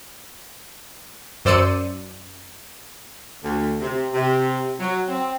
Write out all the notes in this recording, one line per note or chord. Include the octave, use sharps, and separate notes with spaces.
F#2 C5 D5 E6 C#7 D#7
D2
C3
C3
F#3
C4